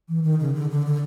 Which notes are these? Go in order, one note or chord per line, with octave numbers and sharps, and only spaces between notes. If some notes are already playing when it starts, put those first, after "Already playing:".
E3
D#3
C#3
D3
D3
D3